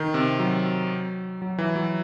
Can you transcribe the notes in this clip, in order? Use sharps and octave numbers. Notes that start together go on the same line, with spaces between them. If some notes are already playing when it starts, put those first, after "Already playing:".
Already playing: D#3
C3
F#3
F#3
E3
F#3